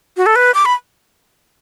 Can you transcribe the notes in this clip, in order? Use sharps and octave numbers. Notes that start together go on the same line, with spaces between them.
F#4
A4
B4
D6
B5